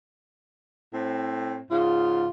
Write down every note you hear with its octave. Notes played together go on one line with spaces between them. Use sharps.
A2 C4
G#2 C#3 F4